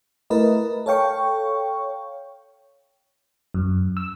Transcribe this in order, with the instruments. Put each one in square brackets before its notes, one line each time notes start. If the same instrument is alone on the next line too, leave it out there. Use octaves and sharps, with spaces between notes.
[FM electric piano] A3 E4 A#4 B4 D#5
A4 C#5 F5 G5 C#6
F#2
E6